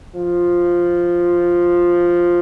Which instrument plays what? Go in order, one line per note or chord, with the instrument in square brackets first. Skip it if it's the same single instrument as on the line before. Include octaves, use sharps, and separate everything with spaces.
[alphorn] F3